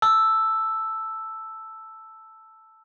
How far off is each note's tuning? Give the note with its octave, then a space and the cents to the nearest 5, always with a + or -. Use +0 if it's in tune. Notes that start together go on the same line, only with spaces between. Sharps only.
A5 +0 E6 +0